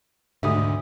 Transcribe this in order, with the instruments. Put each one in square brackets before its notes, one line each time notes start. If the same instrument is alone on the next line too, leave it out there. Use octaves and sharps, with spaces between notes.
[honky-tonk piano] F1 D2 [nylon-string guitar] G#2 D3 D#3 [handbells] E5 D#6